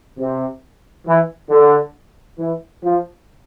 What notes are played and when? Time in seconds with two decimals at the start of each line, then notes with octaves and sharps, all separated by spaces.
0.19 C3
1.07 E3
1.50 D3
2.39 E3
2.83 F3